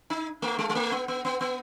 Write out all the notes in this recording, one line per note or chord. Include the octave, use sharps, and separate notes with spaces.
D#4
A3
G#3
G#3
A3
B3
B3
B3
B3